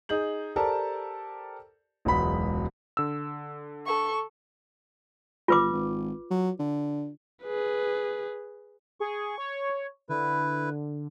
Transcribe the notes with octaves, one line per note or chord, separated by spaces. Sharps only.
D#4 G#4 G6 F#7
G4 A4 A#4 C5 D5 A5
E1 C#2 F#3 B3 B5 B6
D3 E6
A4 C#6
G1 F4 B4 D6
G#1
F#3
D3
G#4 B4
G#4 C#6
C#5
D3 E4 B4